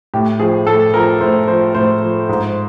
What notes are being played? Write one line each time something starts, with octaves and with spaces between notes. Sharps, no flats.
A2 G4
F3 G#4
A2 A4
F3 A#4
A2 C5
F3 C5
A2 C5
F3
G#2